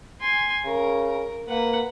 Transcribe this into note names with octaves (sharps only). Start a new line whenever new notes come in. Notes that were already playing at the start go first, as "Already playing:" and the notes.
G#5 C6
C#3 A#4
A#3 B4 F#5